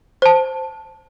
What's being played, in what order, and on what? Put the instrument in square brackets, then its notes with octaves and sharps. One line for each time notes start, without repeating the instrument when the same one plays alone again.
[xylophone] C5 A5